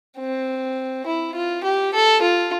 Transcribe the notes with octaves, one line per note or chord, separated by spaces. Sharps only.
C4
E4
F4
G4
A4
F4